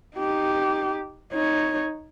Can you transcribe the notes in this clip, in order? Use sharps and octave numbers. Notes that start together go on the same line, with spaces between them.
D#4 G4
D#4 C#5